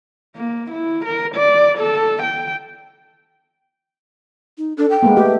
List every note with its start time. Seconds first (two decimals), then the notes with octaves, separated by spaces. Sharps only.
0.36 A#3
0.71 E4
1.05 A#4
1.35 D5
1.78 A4
2.23 G5
4.58 D#4
4.78 D4 A4
4.90 G5
5.03 G#3 A#3 B3
5.17 A3 G4 B4